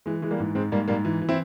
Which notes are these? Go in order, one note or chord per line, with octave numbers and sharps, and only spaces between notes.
E3 G#3
E3 G#3
G3 A#3
G#2
G#2 G#3 C4
G#2 G3 A#3
G#2 G3 A#3
E3
E3
C4 E4